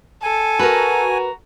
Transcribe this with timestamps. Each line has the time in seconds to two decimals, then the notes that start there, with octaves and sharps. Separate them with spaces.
0.23 A4 G#5
0.59 F#4 A#4 B4 A#5